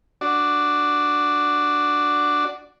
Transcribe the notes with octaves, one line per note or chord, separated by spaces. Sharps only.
D4 F#4 D5